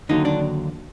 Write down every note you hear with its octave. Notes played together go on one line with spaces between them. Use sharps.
D#2 D3 F#3 D#4
D4